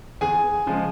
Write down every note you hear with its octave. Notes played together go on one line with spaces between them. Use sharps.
E2 G#4 G#5
C#3 F3 G#3